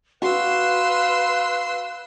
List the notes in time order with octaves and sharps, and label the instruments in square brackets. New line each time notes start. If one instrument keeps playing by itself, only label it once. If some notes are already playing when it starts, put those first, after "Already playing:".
[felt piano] F#4 [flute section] B4 F5 F#6 [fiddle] C6 E6